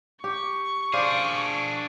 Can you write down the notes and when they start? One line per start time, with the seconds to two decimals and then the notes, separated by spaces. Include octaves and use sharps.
0.24 G4 C#6
0.93 D4 G#4 C5 D5 F5